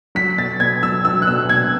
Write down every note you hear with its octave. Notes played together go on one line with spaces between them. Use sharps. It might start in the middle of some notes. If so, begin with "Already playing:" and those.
F#3 B6
B2 A6
B2 G#6
F#3 E6
F#3 E6
F#6
B2 E6
B2 G#6